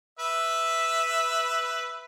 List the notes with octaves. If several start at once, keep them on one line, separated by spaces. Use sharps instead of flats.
B4 E5